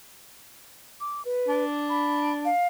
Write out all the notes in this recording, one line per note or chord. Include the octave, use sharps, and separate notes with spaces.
D6
B4
D4
B5
F5